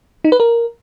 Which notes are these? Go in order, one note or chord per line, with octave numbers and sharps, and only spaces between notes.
D#4
B4
A#4